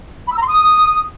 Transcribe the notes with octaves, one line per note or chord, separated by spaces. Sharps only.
B5
E6
A#5
C6
D#6